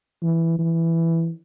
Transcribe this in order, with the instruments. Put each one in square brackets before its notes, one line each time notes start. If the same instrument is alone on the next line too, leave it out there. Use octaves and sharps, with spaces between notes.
[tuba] E3
E3